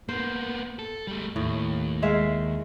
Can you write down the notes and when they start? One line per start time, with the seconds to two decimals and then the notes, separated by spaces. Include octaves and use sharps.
0.09 A#3 B3 C5
0.79 A4
1.07 G3 A3
1.36 D#2 A2
2.02 G#3 E5 F5